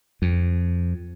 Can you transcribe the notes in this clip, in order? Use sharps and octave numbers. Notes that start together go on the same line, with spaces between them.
F2